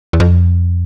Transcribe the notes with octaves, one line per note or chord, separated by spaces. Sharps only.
E2
F2